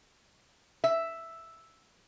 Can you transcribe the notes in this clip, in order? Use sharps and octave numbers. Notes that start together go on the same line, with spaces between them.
E5